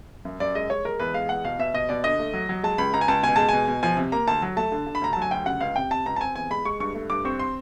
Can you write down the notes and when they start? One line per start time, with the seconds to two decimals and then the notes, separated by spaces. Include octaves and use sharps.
0.25 F#2
0.40 F#2 D5
0.55 G#3 D#5
0.70 G#3 C#5
0.85 G#3 A#4
0.99 E2 B4
1.14 G#3 F5
1.29 E2 F#5
1.44 B2 F5
1.59 B2 E5
1.74 B2 D#5
1.89 B2 D5
2.04 D3 D#5
2.19 A3
2.34 F#3
2.49 F#3
2.63 G#3 A5
2.78 C#2 B5
2.94 C#2 A#5
3.01 G#5
3.08 C#2 A5
3.23 B2 G#5
3.36 G#3 A5
3.49 B2 G#5
3.68 B2
3.83 F3 G#5
3.97 C3
4.12 A#3 A#5
4.27 D2 A5
4.42 F#3
4.57 A3 A5
4.72 D3
4.87 D3
4.95 B5
5.01 D2 A#5
5.13 F#3 A5
5.22 G#5
5.31 D2 G5
5.46 C#3 F#5
5.61 C#2 F5
5.76 C3 G5
5.91 C3 A5
6.06 C#2 A#5
6.16 A5
6.21 C4 G#5
6.35 E2 G#5
6.50 G#3 B5
6.65 G#3 C#6
6.80 G2 C#6
6.94 A3
7.10 G2 D6
7.25 C4 C#6
7.39 C6